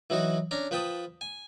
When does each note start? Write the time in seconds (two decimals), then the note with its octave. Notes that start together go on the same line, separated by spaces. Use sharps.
0.10 E3 F#3 D#4 F#4
0.51 C#4 D4 A#5
0.71 F3 B4 G5 A5 D#6
1.21 G#5